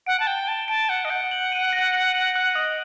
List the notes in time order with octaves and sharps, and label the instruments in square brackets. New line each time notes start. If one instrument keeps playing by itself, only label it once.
[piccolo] F#5 [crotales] D7
[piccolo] A5
[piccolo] G5 [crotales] G7
[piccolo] A5 [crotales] G6
[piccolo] A5 [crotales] D7
[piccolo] F#5 [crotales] G6
[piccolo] D#5
[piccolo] F#5 [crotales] G6
[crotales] F#7
D#7
A#6
A#6
F#7
F#6
[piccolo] D#5 [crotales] D#6